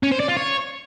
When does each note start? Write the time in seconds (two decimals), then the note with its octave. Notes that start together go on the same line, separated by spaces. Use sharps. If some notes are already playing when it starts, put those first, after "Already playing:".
0.03 C#4
0.11 C5
0.20 D5
0.28 F4
0.37 C#5